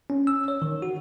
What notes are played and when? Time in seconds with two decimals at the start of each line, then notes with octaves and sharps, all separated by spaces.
0.10 C#4
0.27 E6
0.48 C#5
0.62 D#3
0.82 F#4